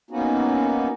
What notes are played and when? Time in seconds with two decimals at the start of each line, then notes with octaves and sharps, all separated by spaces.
0.11 A#3 B3 C#4 D#4 F#4